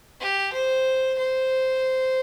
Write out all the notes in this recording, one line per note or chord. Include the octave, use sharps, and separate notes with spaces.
G4
C5
C5